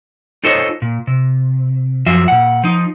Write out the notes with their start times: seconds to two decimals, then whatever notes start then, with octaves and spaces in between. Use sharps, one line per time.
0.44 D#4 F4 A4 C5 C#5 D#5
0.82 A#2
1.07 C3
2.06 F#2 F3 F4 F#4 E5
2.28 A#2 F#5
2.64 F3 D#4